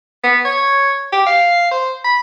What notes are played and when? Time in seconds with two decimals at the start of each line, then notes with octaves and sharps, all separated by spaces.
0.24 B3
0.45 C#5
1.13 G4
1.26 F5
1.71 C5
2.04 B5